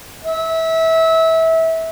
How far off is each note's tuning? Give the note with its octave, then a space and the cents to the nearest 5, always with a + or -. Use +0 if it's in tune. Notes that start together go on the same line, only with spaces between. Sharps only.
E5 -25